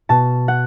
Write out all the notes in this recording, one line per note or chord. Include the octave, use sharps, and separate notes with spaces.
B2 A5
F#5